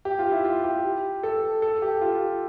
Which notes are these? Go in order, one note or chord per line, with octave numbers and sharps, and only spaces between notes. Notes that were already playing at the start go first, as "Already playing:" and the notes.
G4
F4
E4
F4
G4
A4
A4
G4
F4